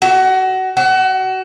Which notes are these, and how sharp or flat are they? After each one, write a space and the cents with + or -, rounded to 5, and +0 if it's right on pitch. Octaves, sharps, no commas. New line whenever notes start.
F#4 +25
F#4 +30